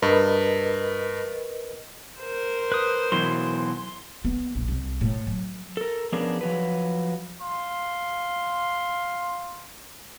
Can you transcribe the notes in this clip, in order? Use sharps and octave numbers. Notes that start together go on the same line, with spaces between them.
G2 A#4 B4 D#5
A#4 C5
B4 D#6
B2 E3 F#3 C6
B3
A#1
C2
A2
F#3
A4 A#4
F3 B3 C#4 D4 G#4 A#4
F3 F#3 B4
F5 C6